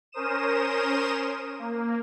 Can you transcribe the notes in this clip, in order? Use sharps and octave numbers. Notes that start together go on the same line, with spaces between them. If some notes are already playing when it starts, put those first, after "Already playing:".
C#4 A#4 C5 D#6 E7
A#3